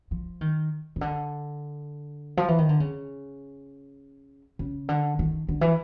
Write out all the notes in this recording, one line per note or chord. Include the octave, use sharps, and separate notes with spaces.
F3
D#3
C#3
D3
F3
E3
D#3
D3
C#3
C#3
D3
D#3
D3
E3